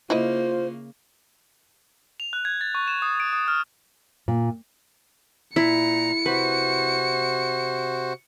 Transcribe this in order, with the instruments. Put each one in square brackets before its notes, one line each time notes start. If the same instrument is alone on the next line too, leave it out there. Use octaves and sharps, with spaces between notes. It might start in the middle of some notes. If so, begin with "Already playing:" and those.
[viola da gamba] C#3 A#3 [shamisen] E4 D#5 [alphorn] F4 [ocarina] C5
[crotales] F7
F#6
G#6
A6
C#6
E7
D#6
D7
D#6
F6
[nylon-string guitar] A#2
[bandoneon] A#2 A#5 [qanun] E4 [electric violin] C#7
[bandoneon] C3 F#4 C5 [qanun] B4